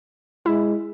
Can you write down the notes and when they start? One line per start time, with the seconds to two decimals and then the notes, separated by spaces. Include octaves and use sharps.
0.46 G#3 E4